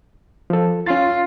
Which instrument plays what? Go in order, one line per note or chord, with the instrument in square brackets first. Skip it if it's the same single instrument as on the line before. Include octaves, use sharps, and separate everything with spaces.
[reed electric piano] F3 A4
[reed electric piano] C#4 C6 A6 [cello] F4